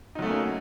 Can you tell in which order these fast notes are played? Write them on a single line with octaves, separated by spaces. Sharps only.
D#4 F#3 A3 C#4 A#3